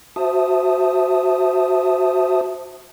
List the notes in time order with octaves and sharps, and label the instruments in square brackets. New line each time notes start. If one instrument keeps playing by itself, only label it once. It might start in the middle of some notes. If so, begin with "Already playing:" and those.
[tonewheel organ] F#4 C5 E5 A5 D#6